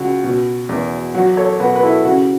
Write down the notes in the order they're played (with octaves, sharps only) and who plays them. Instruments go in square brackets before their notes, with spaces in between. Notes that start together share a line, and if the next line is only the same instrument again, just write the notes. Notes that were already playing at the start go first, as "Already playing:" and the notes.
Already playing: [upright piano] C#2 F#4
B2
E2
F#3 F#4
A4 C#5
B2 F#4 B4
B4
E4 A4
C#3 F#4